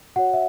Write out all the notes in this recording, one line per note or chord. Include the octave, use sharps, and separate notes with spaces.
F#4 C#5 F#5
E5